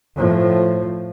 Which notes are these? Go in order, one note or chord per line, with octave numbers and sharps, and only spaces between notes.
A2 F3